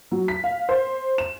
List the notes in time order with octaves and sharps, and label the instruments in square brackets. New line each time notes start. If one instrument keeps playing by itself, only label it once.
[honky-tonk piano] F#3
B6
F5
C5
E7